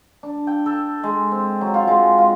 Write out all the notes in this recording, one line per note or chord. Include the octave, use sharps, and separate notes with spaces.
D4
G5
A4
G#3
C4
F#3
F4
G#3
F4